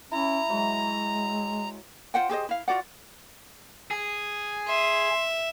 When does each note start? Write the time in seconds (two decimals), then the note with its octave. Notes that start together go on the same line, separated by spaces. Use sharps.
0.12 C#4 E4 A#5
0.50 F#3 G#3
2.14 F4 C5 F#5 G5
2.29 G4 G#4 C5 D#5
2.49 E4 F5
2.68 F4 F#4 D5 F#5
3.91 G#4
4.68 E5 C6